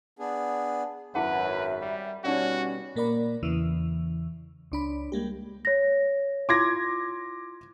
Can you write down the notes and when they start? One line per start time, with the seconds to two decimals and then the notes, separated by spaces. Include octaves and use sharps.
0.19 B3 D4 G#4
1.15 G#1 F#2 E4 G#4 B4 E5 F#5
1.81 G3
2.24 B2 G3 C#4 D#4 F#4 D5 F#5
2.96 A#2 A#3 A#4 D5 B5
3.43 E2 C#3 E3
4.72 C#2 D4 B5
5.12 G3 G#3 A#3 G4
5.65 C#5 A#6
6.49 E4 F4 C6 D6 G#6 A#6